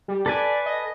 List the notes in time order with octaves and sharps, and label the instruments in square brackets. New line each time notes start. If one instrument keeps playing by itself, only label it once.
[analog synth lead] G3
[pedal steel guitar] A4 B4 G#5 [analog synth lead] D5
[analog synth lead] D#5